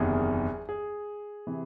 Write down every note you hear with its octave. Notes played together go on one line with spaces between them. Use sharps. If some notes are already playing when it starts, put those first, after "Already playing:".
Already playing: F#1 E2 C3 D#3 G#4
G#4
C3 E3